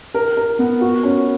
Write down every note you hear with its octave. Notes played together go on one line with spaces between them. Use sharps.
A#4
A#4
B3
F#4
C#4